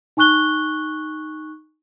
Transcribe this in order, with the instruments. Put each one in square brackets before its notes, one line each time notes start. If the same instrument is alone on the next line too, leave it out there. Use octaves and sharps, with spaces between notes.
[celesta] D#4 G#5 C#6 F#6 G7